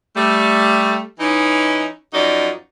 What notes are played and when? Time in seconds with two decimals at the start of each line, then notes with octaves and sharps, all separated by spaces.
0.16 G3 A3
1.20 E3 C#4 D#4
2.14 F#2 F3 D#4 F#4 D5